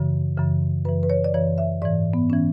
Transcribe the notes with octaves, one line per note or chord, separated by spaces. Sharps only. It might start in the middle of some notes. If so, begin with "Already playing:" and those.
Already playing: F#2 C#3 E3
F#2 C#3 E3
F#2 E3 B4
B4
C#5
D5
F#2 E3 C#5
E5
G#2 E3 D5
B3
E3 C#4